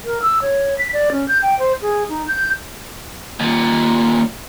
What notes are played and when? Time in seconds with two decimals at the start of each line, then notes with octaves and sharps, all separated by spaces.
0.05 A#4
0.22 E6
0.42 C#5
0.78 B6
0.93 D5
1.12 C#4
1.28 G6
1.42 G5
1.59 C5
1.82 G#4
2.09 D#4
2.28 G6
3.40 D#2 A#2